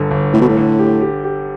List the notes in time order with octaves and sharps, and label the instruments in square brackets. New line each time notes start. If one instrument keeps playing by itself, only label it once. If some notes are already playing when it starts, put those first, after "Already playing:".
Already playing: [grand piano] G1 D3
G1
[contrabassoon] A2 [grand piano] D3
[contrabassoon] B2
A2
[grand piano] D3
G4
G4
G4